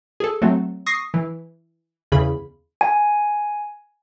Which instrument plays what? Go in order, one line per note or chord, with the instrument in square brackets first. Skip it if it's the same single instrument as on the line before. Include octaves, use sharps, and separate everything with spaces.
[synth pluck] G#4 A4
F#3 A3 C4
C#6 D#6 A#6 C7
E3
E2 C#3 G#4 B5
[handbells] G#5